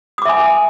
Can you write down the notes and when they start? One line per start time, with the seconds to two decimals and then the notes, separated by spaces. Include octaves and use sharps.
0.18 D#6
0.22 D6
0.25 E5
0.29 G#5